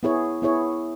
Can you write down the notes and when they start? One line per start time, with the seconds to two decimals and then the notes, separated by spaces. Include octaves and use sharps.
0.03 B3 E4 G#4 C#5
0.42 B3 E4 G#4 C#5